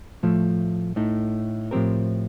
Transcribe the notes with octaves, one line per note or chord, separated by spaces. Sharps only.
A2 F3 A3
A2 A3 D#4
A2 F3 C4 G4 A#4